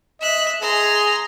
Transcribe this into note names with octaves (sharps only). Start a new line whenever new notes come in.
D#5 E5 F#6
G#4 A#5 C6